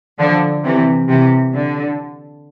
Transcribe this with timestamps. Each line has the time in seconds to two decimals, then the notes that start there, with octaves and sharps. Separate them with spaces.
0.19 D3 F3
0.64 C3 E3
1.09 C3 E3
1.54 D3